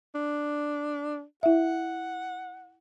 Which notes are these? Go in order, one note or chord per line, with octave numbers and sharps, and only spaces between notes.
D4
E4 E5 F#5